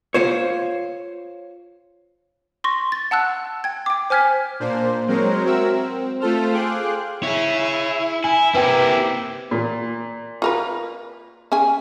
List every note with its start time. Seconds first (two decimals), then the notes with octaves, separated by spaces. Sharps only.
0.14 F4 C5 C#5
2.64 C6 C#6 A#6
2.92 A6
3.11 F#5 A5 E6 F#6
3.64 G5 G#6
3.86 G5 D6
4.10 C5 G#5 F6 G#6 B6
4.60 A#2 A#3 D4 C5
5.07 F#3 G#3 C4 A#4 C5 C#5
5.45 C4 F#4 A#4 E5 E6
5.73 C4
6.20 A3 F4 A4 C5 F6
6.52 G#4 F5 G5 C6 D6 F#6
7.23 E4 G#4 C#5
8.24 E4 G#5
8.54 A#3 C4 E4 G4 B4 G5
9.51 A#2
10.42 F4 A#4 B4
11.52 C#4 G#4 G#5